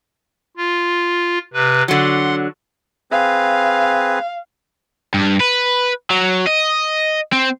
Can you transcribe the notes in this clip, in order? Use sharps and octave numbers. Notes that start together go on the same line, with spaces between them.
F4
C3 B4
D3 F#3 F#5 C6
C4 G#4 B4 F5
G2
B4
F#3
D#5
C4